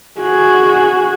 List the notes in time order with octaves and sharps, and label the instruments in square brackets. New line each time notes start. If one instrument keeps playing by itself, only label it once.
[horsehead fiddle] F#4 G#4